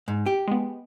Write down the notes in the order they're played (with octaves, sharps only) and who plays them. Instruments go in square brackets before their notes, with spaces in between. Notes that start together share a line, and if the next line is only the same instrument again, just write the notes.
[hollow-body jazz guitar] G#2
G4
[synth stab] G#3 B3